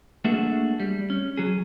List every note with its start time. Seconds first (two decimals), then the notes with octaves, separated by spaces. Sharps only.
0.24 A3 A#3 D4 F#4 G#4 E5
0.80 G3
1.10 C#4
1.37 F#3 G#4